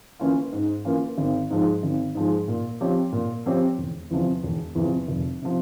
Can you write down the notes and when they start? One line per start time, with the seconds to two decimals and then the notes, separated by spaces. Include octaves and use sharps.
0.19 E3 A#3 C#4 F4
0.52 G#2
0.85 E3 A#3 C#4 F4
1.18 G#1
1.50 G#2 F3 G#3
1.83 G#1
2.15 G#2 F3 G#3
2.48 A#2
2.80 F3 C4 G4 C#5
3.12 A#2
3.46 F3 C4 G4 C#5
3.78 E1
4.11 E2 C3 F3
4.43 E1
4.75 E2 C3 F3
5.08 F1
5.42 C3 F3